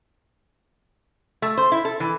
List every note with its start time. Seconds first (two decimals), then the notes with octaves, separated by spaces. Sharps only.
1.42 A3
1.57 C5
1.72 E4
1.85 A4
2.00 E3